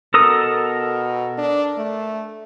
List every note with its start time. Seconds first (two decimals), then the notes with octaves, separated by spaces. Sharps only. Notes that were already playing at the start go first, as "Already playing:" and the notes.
0.14 B2 A4 A#4 D#6
1.38 D4
1.77 A3